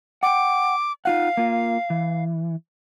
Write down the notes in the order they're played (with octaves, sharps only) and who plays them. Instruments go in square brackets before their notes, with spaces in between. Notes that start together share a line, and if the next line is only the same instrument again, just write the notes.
[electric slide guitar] F#5 G5 [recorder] D6
[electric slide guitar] D#4 F4 F#5 [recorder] F5
[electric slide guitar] A#3 F4
E3